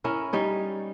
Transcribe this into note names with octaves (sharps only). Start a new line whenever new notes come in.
C#4 E4 A#4
G3 D#4 C#5